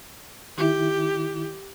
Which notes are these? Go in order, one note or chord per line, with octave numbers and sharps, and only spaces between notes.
D#3 E4 G4